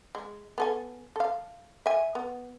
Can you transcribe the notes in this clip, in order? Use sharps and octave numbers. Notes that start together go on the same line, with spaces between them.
G#3
B3 A4 G#5
A4 F5
E5 G#5
B3